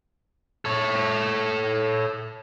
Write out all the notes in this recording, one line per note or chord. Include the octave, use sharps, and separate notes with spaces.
A4 C#5